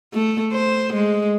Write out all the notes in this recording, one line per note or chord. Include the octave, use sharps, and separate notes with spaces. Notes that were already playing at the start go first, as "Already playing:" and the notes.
A3
C5
G#3